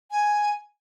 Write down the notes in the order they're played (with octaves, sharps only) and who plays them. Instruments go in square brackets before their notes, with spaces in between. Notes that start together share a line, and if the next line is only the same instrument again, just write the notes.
[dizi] G#5